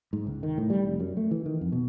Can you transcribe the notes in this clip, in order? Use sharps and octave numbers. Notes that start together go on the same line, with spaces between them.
G#2
C#2
D#3
A2
G3
F1
F#2
A3
E3
D#3
F2
B2